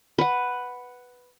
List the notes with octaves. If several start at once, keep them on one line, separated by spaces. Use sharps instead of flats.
B4 F#5